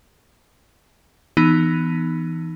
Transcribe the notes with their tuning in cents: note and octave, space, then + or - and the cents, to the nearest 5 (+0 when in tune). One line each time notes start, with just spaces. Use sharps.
E3 +0 B3 +0 D#4 +0